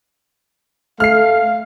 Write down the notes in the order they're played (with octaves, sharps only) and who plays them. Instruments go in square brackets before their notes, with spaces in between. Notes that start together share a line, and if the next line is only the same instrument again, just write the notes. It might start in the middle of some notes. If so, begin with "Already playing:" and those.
[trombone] A3 [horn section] F5 [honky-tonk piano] F6 C7